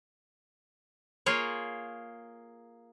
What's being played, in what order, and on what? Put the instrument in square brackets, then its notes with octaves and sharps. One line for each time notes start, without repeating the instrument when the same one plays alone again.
[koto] A#3 F4 G#4 C#5